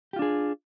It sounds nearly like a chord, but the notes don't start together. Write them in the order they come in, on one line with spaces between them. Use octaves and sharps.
G4 F4 D4 G#4